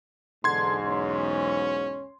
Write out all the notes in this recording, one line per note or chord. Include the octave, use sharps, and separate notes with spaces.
B1 E2 G#2 D3 C6 G#6
C#4